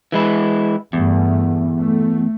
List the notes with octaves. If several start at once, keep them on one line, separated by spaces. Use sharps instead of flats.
E3 G#3 E4
E2 G2 A3
A3